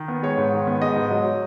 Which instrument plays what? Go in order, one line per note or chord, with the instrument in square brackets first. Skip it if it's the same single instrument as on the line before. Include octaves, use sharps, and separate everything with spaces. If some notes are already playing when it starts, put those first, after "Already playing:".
Already playing: [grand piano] D#3
B3
G#3 C#5
G#2
D#3
B3
G#3 D#5
G#2
F#3